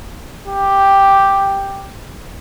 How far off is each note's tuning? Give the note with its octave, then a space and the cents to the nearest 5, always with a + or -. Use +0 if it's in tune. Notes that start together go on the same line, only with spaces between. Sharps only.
G4 +0